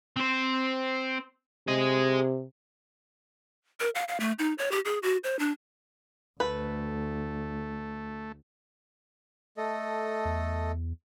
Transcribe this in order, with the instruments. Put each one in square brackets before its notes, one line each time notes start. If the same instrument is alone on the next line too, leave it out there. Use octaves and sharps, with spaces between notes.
[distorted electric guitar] C4 C5
[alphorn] C3 [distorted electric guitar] G#4 D#5
[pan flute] A#4
F5
F5
A3
D#4
C#5
G4
G#4
F#4
C5
D4
[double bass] D2 [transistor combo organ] A3 [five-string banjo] B4
[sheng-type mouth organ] A3 A4 D#5
[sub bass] E2